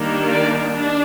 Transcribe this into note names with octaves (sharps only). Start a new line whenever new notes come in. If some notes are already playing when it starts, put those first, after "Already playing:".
Already playing: D#3 G3 A#3 D4
D5
D4